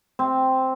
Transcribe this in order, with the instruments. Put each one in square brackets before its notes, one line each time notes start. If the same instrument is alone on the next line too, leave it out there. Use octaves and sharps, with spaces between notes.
[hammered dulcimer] C4